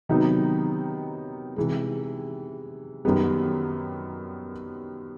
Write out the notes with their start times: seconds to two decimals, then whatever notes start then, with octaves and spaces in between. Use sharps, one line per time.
0.09 C3 D#3 F#3 B3 D#4
1.56 C3 E3 G#3
3.05 F#2 D#3 G3 B3